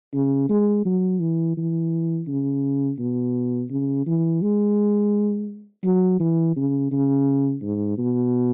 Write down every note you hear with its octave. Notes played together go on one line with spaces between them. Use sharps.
C#3
G#3
F#3
E3
E3
C#3
B2
C#3
E3
G#3
F#3
E3
C#3
C#3
G#2
B2